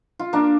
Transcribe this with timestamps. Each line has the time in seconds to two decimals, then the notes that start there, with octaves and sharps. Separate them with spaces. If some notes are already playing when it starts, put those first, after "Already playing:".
0.19 F4
0.33 A#3 D4